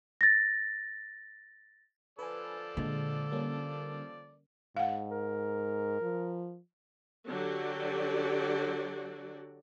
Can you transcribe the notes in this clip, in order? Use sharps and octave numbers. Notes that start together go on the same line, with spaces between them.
A6 A#6
F3 A4 B4 D5 G#5
A#2 D3 G#3
G3 A#3 C#4
G#2 F5 F#5
A#4
F3
D3 F#3 F#4 G4 D5